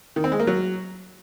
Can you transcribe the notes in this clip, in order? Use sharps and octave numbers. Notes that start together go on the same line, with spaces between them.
D#3
C4
G#3
A#3
F#3